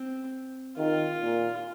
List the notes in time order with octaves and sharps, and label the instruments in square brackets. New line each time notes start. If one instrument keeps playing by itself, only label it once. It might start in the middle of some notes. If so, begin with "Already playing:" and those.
Already playing: [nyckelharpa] C4
[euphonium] D#3 [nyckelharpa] F4
[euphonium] A#2